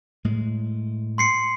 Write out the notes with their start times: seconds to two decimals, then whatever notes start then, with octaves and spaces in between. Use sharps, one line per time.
0.25 A2 G#3
1.18 C6 C7 C#7